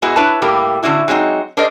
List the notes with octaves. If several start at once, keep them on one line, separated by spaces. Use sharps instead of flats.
G#2 G#3 B3 E4 F#4
D4 E4 B4 C#5 A5
A2 G3 A#3 G4
A2 D3 G#3 C#4 E4 F#4
F#3 G#3 C4 C#4 D#4
D4 G#4 A#4 C5 D5 D#5